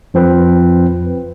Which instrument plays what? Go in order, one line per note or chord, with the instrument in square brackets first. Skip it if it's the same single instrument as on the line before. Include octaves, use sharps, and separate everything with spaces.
[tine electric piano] F2 F3 C4 B4